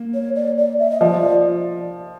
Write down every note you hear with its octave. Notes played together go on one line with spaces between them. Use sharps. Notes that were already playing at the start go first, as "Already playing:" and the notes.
Already playing: A#3
C#5
D5
D5
E5
D#5
F3 D5